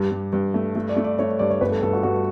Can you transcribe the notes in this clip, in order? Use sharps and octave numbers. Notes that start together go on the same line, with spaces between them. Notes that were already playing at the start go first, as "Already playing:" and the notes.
Already playing: G2 G4
G2
G2
A3
A3
D5
A3
D5
A3 C#5
G2 D5
C#5
G1 B4
A4
G1 A4
F#4
G2 F#4